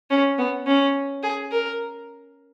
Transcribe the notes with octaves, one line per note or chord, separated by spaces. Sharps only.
C#4
B3
C#4
G#4
A#4